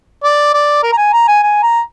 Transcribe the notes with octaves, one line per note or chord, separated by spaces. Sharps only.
D5
D5
A#4
A#5
G#5
A#5
G#5
G#5
A#5